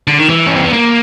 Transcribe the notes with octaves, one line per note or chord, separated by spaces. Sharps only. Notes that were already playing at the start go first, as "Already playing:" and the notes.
D3
D#3
E3
C#4
C4
B3
A#3